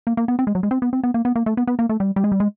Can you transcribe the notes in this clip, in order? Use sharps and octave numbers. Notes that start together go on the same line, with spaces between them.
A#3
A#3
B3
C4
G#3
F#3
G#3
C4
B3
C4
B3
A#3
B3
A#3
A3
B3
B3
A#3
A3
G3
G3
G#3
G3
G#3